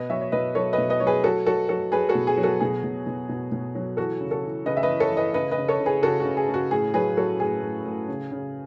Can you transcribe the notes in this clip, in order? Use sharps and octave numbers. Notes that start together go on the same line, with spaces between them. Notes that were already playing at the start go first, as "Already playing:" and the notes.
Already playing: B2 B4 D#5
F#3 C#5 E5
C#5
B2 B4 D#5
F#3 A4 C#5
B4 D#5
B2
B4 D#5
F#3 C#5
G#4 B4
F#3 F#4 A4
F#3 F#4 A4
F#3 F#4 A4
F#3 G#4 B4
F#4 A4
B2
G#4
F#3
F#4 A4
B2 G#4
B2
B2
B2
B2
F#3
E3 F#4 A4
C#3
F#4 A4
E3
C#3 B4 D#5
E5
B4 D#5
E3
A4 C#5
E3
B4 D#5
C#3 B4 D#5
B4 D#5
C#3
A4 C#5
C#3
G#4 B4
C#3 F#4 A4
F#4
C#3
G#4
C#3
F#4
A2 G#4
F#3 G#4 B4
F#3 F#4 A4
A2 G#4
A2
A2
C#3
C#3